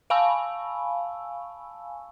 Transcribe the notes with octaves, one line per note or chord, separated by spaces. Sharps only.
F5 G#5 A5 B5 C#6 E6